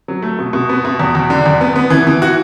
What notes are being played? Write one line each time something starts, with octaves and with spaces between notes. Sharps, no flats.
F#3
A3
B2
B2
B3
B2
E2
E2
D3
E2
B3
B3
E3
E3
F#4